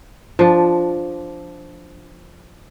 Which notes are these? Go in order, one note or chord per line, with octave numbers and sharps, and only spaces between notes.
F3 D4